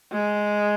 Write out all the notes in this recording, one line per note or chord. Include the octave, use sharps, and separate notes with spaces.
G#3